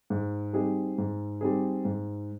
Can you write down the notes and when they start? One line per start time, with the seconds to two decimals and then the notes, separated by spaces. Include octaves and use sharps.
0.10 G#2
0.53 G3 C4 D#4 G#4
0.98 G#2
1.41 G3 C4 D#4 G#4
1.85 G#2